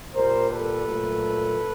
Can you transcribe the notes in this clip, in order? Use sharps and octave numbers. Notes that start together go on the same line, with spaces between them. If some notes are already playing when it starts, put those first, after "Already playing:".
A#2 G3 A#3 A#4 C5
A4 B4
A#2 F#3 A3